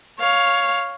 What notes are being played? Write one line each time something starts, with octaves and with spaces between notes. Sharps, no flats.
C#5 F5